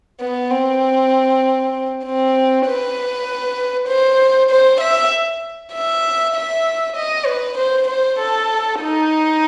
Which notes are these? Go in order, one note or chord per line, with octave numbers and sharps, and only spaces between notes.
B3
C4
C4
B4
C5
C5
E5
E5
E5
D#5
B4
C5
C5
A4
D#4